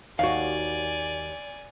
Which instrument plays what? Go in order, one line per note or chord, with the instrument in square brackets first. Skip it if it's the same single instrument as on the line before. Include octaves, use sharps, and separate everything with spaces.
[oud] D#2 F#4 [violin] D5 G#5 [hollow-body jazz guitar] F5